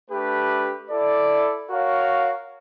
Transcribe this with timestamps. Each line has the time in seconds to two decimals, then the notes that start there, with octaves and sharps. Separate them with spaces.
0.10 A3 D4 G4 B4
0.90 E4 A4 D5
1.70 F#4 A#4 C#5 F5